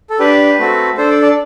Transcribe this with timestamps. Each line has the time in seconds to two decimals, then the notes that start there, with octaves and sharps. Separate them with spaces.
0.10 A4
0.19 D4 G4 B4
0.59 A3 C4 F#4 A4
0.97 D4 A4 C5
1.10 D5
1.22 D5